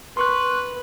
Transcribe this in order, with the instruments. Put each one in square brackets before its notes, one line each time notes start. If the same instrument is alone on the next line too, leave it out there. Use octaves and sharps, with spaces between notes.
[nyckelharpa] B4 [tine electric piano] C6 C#6 F#6